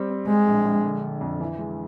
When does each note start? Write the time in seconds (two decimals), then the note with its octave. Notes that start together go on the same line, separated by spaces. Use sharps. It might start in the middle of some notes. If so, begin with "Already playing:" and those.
Already playing: G3 C4
0.10 C4
0.28 G#3 C4
0.47 A#1
0.65 A#1
0.84 D3
1.02 D3
1.21 F2
1.40 E3
1.59 G#3